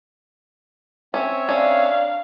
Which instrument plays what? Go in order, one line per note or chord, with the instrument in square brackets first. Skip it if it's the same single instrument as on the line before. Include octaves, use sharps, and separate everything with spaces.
[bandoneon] C4 C#5 E5 [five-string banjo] C#4
[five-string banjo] C#4 [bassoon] D4 [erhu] F5